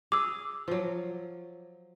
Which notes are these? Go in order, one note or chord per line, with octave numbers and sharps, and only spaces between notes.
G#4 D6 E6
F3 F#3